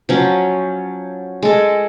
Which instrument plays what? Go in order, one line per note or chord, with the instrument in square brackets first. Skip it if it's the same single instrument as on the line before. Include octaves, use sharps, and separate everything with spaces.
[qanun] F3 F#3 C#4
G#3 A4